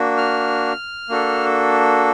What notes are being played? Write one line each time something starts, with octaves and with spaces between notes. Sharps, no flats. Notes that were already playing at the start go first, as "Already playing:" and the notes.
Already playing: A#3 D4 F#4
F6
A#3 D4 F#4 A4